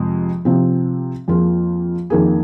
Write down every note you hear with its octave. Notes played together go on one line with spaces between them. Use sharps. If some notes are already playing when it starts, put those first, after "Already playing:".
Already playing: F2 C3 G#3
C3 F3 C4
F2 F3 A#3 F4 G#4
F2 D#3 A#3 G#4